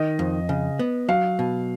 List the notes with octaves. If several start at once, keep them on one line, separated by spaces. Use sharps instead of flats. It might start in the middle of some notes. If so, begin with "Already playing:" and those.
Already playing: D#3 D#5
F2
C#3
B3
F#3 F5
B2